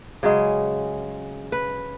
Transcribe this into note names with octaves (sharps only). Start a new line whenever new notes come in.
C#3 F#3 G#3
B4